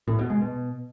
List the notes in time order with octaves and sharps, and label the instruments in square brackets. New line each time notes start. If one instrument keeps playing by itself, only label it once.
[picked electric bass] A2
B2
G#3
B2